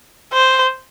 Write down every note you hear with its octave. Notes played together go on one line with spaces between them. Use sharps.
C5